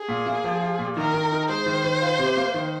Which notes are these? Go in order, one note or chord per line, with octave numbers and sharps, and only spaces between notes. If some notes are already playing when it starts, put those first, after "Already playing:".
Already playing: G#4
A#2
A#3
F3
F4
A#2
D#3 A#4
D#3
D#4
G#3 C5
D#3
D#3
F4
C3
A#3
D#3